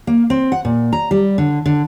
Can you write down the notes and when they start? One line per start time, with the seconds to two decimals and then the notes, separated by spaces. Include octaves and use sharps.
0.07 A#3
0.30 C4
0.52 F#5
0.65 A#2
0.93 A#5
1.11 G3
1.38 D3
1.66 D3